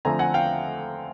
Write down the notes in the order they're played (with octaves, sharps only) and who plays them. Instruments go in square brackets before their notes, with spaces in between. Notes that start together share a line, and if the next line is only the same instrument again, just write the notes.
[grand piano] D3 F3 A3 C4 G#5 A#5
F#5 G#5
F5 G5